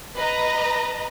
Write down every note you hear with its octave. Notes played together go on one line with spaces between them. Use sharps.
B4 D#5 A#5